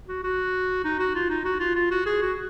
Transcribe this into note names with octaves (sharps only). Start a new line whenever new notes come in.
F#4
F#4
D#4
F#4
F4
D#4
F#4
F4
F4
F#4
G#4
F#4